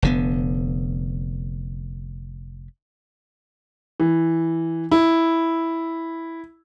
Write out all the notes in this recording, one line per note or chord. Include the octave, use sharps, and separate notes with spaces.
F1 D3 B3
E3
E4